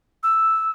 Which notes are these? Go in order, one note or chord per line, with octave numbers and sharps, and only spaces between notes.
E6